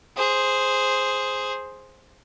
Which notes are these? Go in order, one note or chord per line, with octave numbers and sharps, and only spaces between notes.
G#4 C5